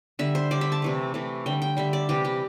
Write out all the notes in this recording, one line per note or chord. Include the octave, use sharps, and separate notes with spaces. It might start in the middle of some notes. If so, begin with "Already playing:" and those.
D3 G3 E5
C5
D3 G3 D5
E5
A5
C3 E3 A3
C3 E3 A3
D3 G3 G5
G5
D3 G3 E5
D5
C3 E3 G3 G4
G4